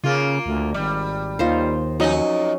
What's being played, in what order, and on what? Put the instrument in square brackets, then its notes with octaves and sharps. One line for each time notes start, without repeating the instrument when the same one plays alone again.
[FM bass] C#3 [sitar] A#3 F4
[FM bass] D2
[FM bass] G#1 [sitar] G3
[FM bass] D#2 [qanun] D#4 F4 C5
[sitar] F2 D#4 D#5 [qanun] F#3 C#4